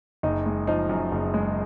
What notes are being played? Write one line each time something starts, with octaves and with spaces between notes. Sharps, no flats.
F#1 D#4
G#3
F3 D#4
F#2
F#1
G#3